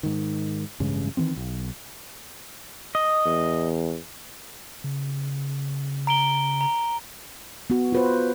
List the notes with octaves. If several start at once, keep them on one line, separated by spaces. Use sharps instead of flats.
G#2 D#3
A1 G2 C#3 G#3
D#3 E3 A#3 C4
B1
D#5
E2
C#3
A#5 D7 G7
A#5
B3 F#4
F4 B4 C5